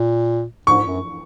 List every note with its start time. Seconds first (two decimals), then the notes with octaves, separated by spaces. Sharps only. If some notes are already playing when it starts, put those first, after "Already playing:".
Already playing: A#2
0.67 G#2 C#6
0.86 F#2